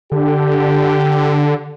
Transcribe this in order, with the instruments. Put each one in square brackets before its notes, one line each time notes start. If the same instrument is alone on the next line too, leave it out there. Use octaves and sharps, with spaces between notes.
[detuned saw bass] D3 [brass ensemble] G4